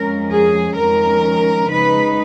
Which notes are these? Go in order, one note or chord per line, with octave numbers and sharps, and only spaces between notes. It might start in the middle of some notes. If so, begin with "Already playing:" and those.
Already playing: F2 F3 G#3 C#4 A#4
G#4
F2 D#3 G#3 C#4 A#4
C#3 G#3 D#4 B4